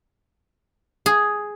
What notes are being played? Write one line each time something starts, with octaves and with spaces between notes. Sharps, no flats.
G#4